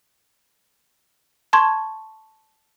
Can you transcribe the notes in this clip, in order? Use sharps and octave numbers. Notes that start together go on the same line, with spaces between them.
A5 C6 C#6 G#6